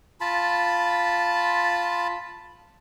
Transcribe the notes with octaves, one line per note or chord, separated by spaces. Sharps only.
F4 A5 B5